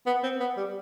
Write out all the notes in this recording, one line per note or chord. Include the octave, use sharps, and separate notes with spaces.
B3
C4
B3
G3